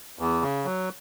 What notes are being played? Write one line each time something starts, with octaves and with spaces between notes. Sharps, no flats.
E2
C#3
F#3